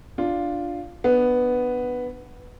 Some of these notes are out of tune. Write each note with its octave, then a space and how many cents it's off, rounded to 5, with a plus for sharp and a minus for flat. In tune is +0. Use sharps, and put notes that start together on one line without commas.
D4 +0 F4 +0
B3 +0 D4 +20